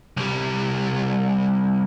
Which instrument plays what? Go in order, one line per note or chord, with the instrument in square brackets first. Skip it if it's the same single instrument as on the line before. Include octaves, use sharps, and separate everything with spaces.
[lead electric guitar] C2 G3